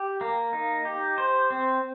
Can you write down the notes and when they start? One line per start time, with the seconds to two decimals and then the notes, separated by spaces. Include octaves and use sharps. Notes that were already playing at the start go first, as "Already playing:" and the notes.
Already playing: G4
0.21 A#3
0.53 D#4
0.85 G4
1.18 C5
1.51 C4